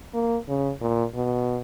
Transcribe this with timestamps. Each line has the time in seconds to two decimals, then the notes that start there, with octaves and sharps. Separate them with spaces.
0.14 A#3
0.48 C#3
0.81 A#2
1.14 B2